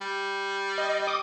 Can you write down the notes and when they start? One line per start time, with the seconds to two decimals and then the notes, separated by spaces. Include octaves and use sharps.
0.01 G3
0.78 D#5
1.07 D6 D#6